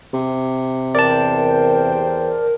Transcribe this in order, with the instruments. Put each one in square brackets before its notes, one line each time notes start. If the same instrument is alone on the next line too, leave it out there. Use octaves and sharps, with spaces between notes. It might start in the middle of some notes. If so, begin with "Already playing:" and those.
[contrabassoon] C3
[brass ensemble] E2 C5 G5 [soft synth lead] A#4 [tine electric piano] D5 A5